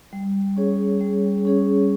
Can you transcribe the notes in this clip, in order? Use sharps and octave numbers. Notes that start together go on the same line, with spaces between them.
G3
C#4 G#4 C#5
G3
C#4 G#4 C#5